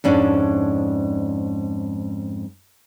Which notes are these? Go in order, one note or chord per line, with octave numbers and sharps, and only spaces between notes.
F2 G#2 C#4 D4